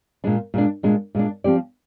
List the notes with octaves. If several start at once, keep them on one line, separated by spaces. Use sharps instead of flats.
A#2 G#3 D4
A#2 G#3 D4
A#2 G#3 D4
A#2 G#3 D4
F3 C4 G4 D5